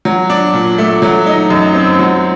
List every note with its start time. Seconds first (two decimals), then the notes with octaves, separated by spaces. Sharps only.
0.05 F#3
0.30 D4
0.53 A#2
0.78 A3
1.02 F#3
1.26 D#4
1.50 F#2
1.75 C4
1.99 F#3